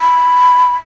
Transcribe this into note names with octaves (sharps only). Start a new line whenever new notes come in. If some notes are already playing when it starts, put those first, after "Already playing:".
B5